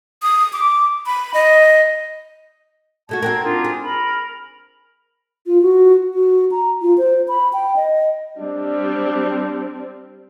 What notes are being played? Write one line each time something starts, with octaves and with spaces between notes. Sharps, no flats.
D#6
D6
B5
D#5
B2 A3 F#4 A5 G#6
C4 F#4 A#4
D4 D#4 F4
G#4
A#4 B5
F4
F#4
F#4
A#5
F4
C5
B5
G5
D#5
G3 C4 D4